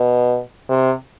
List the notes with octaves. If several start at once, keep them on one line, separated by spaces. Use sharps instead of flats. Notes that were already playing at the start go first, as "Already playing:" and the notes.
Already playing: B2
C3